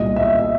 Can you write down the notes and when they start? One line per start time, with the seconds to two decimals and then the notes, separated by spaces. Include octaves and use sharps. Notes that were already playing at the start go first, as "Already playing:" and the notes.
Already playing: C2 A#2 D#5
0.16 E5
0.20 D#5
0.40 E5